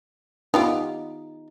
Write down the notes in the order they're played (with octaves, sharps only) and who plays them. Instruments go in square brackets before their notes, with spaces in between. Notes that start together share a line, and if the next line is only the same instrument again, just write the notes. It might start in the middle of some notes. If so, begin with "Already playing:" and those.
[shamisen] B3 F4 G4 [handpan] D#4